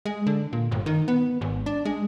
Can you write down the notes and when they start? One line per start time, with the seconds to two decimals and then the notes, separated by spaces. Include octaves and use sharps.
0.06 G#3
0.27 D3
0.53 A#2
0.72 G1
0.86 D#3
1.08 B3
1.41 G#1
1.66 D4
1.85 G#3